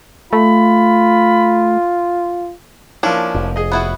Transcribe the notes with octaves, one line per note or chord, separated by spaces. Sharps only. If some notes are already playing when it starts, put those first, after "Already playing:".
A3 F4 B5
F3 A#3 C#4 D4 E4
F1
G#4 D#5
B3 E4 F#4